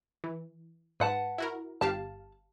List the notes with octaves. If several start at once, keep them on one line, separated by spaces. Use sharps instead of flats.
E3
G#2 B4 F#5 A5
E4 F#4 A#4
G1 G4 F5 A5